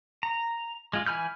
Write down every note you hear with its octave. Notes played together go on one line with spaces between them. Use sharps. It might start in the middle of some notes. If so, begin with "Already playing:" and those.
A#5
G#3 F4
E3 G#5 B5 F6 G6